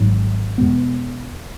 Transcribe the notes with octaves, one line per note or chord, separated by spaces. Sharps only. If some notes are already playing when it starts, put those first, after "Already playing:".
Already playing: G#1 G#2 F#3
E2 B2 G#3 B3